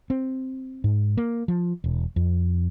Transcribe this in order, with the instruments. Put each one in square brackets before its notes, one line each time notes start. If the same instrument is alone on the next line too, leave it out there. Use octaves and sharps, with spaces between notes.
[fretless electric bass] C4
G#2
A#3
F3
E1
F2